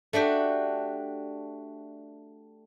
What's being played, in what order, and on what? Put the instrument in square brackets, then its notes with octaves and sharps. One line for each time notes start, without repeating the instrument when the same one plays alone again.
[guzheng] A3 D4 F#4 G4